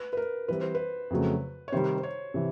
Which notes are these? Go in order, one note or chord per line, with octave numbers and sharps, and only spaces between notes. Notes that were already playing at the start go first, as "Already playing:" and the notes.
Already playing: B4
B4
A#4
E3 G3 C4 B4
C5
B4
F2 C#3 F#3 A3
C#5
C3 D#3 G3 C5
C5
C#5
C3 E3